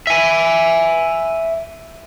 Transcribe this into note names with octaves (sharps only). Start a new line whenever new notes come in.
E5 G#5